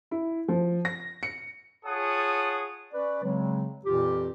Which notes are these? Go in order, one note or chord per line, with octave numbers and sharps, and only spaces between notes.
E4
F3
A#6
C#7
F4 G#4 C#5 F#5 A5 D#6
C#4 B4 D5
C#3 F#3 G#3 C4
F2 A#2 E3 F4 G4